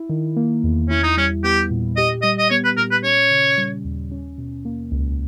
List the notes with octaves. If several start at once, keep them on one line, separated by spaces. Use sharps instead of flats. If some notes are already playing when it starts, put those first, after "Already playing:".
Already playing: E4
D#3
A#3
E2
C#4 E4
D#4
G3 C#4
B3 G4
A#2
G4 D#5
G3 D#5
D#5
B3 C#5
B4
A#2 A#4
B4
C#4 C#5
C#3
G3
D#2
C#4
B2
A#3
C#2